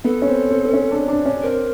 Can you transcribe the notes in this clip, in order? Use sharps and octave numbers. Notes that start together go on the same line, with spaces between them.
B3 A4
C#4
C4
C4
C4
C#4
D4
D4
C#4
C4 A#4